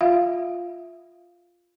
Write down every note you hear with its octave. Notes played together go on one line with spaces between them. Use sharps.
F4 E5 F5